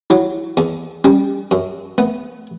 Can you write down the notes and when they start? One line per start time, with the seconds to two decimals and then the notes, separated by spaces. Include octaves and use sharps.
0.10 F#3 E4
0.57 E2
1.04 G3 C#4
1.51 F#2
1.98 A3 B3